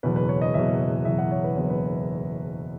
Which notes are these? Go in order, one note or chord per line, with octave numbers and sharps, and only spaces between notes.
F#1 E2 B2 B4
B4
C#5
D#5
F#1 E2 B2 E5
F#1 E2 B2 E5
F#5
C#5
B4
F#1 E2 B2 B4
B4